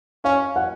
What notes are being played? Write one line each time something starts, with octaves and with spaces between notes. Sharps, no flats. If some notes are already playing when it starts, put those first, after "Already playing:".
C#4 F5
F#5